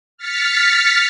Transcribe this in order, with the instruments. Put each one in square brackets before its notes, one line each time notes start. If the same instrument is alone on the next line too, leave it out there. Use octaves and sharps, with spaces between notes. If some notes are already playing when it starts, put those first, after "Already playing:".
[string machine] F6 A6 B6 C#7